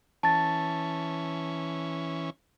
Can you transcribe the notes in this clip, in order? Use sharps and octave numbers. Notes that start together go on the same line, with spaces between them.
E3 C#4 A5 A6